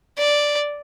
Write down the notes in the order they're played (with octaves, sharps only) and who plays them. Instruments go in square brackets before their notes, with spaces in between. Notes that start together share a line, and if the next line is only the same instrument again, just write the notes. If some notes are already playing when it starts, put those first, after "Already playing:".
[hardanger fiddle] D5